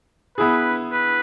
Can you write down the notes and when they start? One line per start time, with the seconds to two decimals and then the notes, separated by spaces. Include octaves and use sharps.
0.37 B3 E4 G#4 B4
0.92 B4